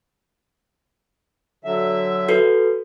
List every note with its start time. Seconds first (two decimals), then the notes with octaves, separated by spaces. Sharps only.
1.64 D3 F#3 E5
2.29 F#4 A4 B4